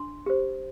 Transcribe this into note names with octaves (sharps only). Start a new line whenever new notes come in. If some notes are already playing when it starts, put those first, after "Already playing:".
Already playing: D4 C6
G4 C5